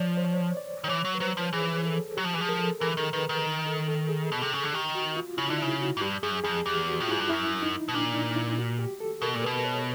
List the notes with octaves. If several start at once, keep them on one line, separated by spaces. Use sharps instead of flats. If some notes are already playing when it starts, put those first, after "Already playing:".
Already playing: F3 C#5 D5
C5
C#5
D5
D#3
E3 C#5
F#3
B4
F#3 C5
F3
E3 G#4
A4
F#3 G4
F3
E3
F3 G#4
A#4
A4
E3 A#4
D#3
D#3 B4
D#3
A#4
A4
A4
G#4
B2
C3
C#3
D3
D#3 G4
F#4
F4
C#3 E4
D3 D#4
E4
C#3
F#4
G#2
G2 G4
F#2 G#4
F2 G#4
E2 G4
F#4
A2 F4
G#2 E4
G2
F#2 E4
D#4
B2
A#2 D4
D#4
E4
F#4
G4
A4
B2 A#4
A#2
B2 B4
C#5